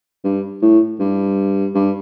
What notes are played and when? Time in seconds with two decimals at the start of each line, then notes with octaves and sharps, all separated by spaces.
0.24 G2
0.62 A2
0.99 G2
1.75 G2